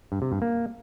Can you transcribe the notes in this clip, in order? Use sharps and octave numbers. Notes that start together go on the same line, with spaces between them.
G2
C3
G2
A#3